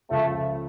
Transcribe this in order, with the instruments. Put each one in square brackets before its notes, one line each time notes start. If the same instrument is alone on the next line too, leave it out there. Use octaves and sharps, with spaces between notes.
[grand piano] C#2 C#3 F3 [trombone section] A3